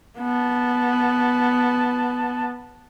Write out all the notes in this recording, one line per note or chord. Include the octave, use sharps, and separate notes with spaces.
B3 A5